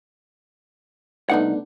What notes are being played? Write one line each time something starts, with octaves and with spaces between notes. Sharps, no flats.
C2 A3 B3 D4 D#4 F#5